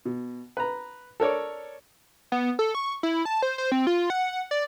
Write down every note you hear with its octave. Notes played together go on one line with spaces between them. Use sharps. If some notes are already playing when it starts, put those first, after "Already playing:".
B2
B4 A#5
A4 A#4 C#5 D5
B3
A4
C#6
E4
A5
C5
C5
C4
F4
F#5
D5